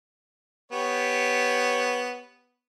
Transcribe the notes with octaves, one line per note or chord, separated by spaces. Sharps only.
B3 G4 C#5